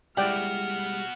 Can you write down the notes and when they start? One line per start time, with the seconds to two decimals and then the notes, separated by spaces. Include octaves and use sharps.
0.17 B2 G3 G#3 E4 D5 F#5 G5 F6